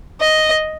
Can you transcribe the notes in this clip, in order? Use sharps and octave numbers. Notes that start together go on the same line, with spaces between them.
D#5